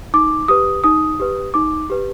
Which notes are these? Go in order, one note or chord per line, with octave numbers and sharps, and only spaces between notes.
D#4 D6
G4 B4 D#6
D#4 D#6
G4 B4
D#4 D6
G4 B4